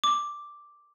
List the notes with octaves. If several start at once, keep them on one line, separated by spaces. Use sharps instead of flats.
D6